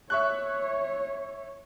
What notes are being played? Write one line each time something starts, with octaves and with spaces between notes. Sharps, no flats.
C#5 E5 C#6 F#6